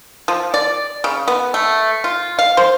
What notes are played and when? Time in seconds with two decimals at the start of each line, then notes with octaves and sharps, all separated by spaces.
0.28 F3
0.54 D5
1.04 C#3
1.28 B3
1.54 A3
2.04 F4
2.39 F5
2.57 C5